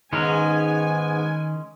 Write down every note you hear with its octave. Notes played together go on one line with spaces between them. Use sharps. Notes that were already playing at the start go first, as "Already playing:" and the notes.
G#2 D#3 G#3 B3 C#4 G#5 A#5